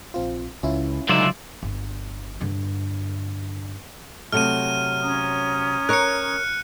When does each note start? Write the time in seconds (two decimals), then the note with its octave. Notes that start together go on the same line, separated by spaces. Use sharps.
0.14 A#1 C4 F4
0.63 C#2 C#4 E4 F4
1.09 C#2 D3 F#3 D#4 F4 D5 E5 A#5
1.63 G1
2.41 G2 D3
4.32 C3 F#3 A3 F6 D#7
5.01 C#4 A#5 D#6
5.89 A#4 C#5 F#6 C#7